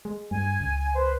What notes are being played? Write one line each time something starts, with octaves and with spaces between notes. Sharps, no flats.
G#3
G2 G#5
C#2
B4 C5